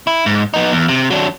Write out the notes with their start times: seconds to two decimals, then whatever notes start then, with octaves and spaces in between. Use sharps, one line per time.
0.07 E4
0.26 G#2
0.54 B3 D#4
0.72 E2
0.88 C3
1.10 F#3 D4